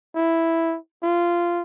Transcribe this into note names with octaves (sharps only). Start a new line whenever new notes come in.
E4
F4